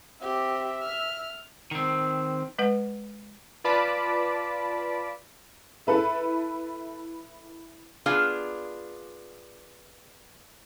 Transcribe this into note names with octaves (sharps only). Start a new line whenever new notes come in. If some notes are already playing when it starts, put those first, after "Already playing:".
C4 G4 E5
F6
D#3 C4
G#3 B4 F#5
F4 B4 D5 A5 B5 D6
E4 A4 B4 E5
B3 D4 F4 G#4 F5 A5